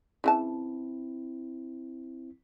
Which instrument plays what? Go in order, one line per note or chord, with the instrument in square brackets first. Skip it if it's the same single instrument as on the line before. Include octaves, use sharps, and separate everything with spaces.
[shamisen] C#3 E3 A5 [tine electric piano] C4 E4